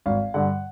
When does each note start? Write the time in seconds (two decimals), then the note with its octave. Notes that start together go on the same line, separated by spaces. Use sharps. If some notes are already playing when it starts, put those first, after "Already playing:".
0.06 G#1 F5
0.34 G2 D3 F#5